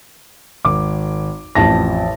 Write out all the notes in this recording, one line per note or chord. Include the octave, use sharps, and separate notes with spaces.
G#1 D6
A1 F2 A5 A#6